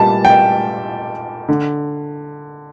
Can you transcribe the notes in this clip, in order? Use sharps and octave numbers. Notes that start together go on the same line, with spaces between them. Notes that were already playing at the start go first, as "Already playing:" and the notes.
Already playing: A#2 G3 A5
G5
D3